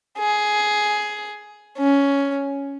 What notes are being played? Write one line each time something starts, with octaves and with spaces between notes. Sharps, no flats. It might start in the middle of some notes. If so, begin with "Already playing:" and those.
G#4
C#4